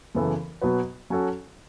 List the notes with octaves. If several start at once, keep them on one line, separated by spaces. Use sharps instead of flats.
F#2 C#3 E3 B3 A4
B2 F#3 B3 F#4 B4
F#3 C#4 F#4 A4